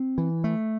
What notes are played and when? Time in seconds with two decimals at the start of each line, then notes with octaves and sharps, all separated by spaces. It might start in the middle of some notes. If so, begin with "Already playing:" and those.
Already playing: C4
0.18 E3
0.44 A3